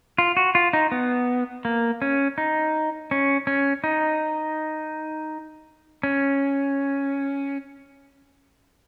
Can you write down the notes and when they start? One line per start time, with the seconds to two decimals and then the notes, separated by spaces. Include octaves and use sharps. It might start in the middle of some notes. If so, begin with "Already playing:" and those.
0.18 F4
0.37 F#4
0.55 F4
0.73 D#4
0.92 B3
1.65 A#3
2.02 C#4
2.38 D#4
3.11 C#4
3.47 C#4
3.84 D#4
6.03 C#4